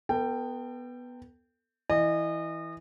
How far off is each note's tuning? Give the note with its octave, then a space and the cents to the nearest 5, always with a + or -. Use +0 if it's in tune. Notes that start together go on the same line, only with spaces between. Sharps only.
B3 +0 A4 +40 G5 +0
E3 +0 D#5 -30